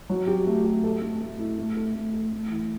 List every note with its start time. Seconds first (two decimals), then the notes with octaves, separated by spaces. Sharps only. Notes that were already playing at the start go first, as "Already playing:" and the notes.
0.09 F#3
0.27 G4
0.47 A3
0.64 G4
0.84 A4
1.02 A3
1.21 A3
1.39 E4
1.58 A3
1.76 A4
1.95 A3
2.13 A4
2.32 A3
2.50 E3